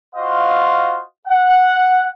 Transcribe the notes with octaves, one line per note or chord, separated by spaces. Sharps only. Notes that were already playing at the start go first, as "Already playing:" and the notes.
F4 F#4 C5 D#5 F5
F#5